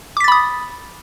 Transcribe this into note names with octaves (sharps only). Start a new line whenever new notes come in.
B5 D6 D#6 A6 B6